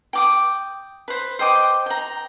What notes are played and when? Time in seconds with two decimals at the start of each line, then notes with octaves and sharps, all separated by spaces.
0.13 G5 D6 D#6
1.08 B4 C5
1.39 C5 D#5 G5 D6
1.86 G5 A#5